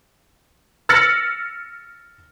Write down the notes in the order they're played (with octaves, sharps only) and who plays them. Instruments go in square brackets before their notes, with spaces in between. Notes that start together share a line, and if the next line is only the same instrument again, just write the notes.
[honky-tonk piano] E6 F6 A6 A#6 C#7 F#7